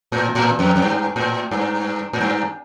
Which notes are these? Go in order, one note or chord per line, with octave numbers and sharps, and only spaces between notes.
A2
A2
F2
F2
G2
A2
G2
A2
G2